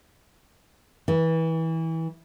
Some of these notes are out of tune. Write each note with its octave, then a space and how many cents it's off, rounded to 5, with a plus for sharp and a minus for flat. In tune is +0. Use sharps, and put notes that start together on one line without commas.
E3 -25